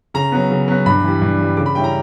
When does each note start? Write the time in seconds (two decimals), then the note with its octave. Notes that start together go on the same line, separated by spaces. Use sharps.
0.14 C#3 A#5
0.32 F#3 B3
0.51 C#3
0.68 F#3 B3
0.86 G2 B5
1.03 E3 G3
1.22 G2
1.39 E3 G3
1.57 C#3 D6
1.66 B5
1.75 G3 C#4 E4 G5
1.84 A#5